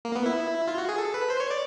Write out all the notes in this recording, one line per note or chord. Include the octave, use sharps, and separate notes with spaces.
A#3
B3
E4
F4
F#4
G#4
A4
B4
C5
C#5
D5